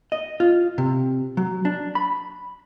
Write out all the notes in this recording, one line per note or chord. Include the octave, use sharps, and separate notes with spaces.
D#5
F4
C3
F#3
D4
B5